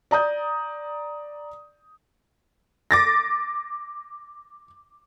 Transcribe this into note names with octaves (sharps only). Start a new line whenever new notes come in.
D5 A#5 D#6 G6
D6 A6 A#6